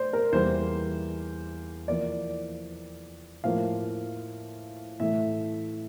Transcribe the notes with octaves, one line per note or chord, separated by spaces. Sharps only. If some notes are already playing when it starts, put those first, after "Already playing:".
Already playing: A3 C5 D5
A#4
E2 E3 G3 A#3 C5
F2 E3 A#3 D5
A2 F3 A#3 F5
A2 E3 A3 E5